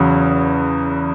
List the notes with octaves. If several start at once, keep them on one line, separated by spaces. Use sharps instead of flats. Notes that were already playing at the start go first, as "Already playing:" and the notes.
Already playing: E2 C#3 F#3